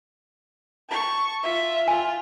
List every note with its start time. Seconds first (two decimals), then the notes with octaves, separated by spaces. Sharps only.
0.89 A5 C#6
1.43 F4 E5
1.88 F4 G#5